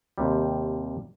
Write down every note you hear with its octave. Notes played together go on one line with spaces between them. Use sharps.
D#2 C3 G3